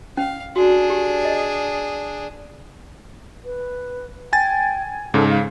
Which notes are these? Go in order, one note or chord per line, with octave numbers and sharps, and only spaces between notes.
C#4 F5
D4 F#4 G#4
G4
D#5
B4
G5 G#5 A6
G#2 C#3 A4
F5